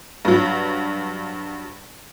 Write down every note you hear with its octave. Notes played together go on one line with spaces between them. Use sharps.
G2 F#3